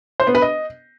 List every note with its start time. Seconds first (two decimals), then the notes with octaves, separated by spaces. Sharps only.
0.20 C5
0.27 B3
0.35 B4
0.42 D#5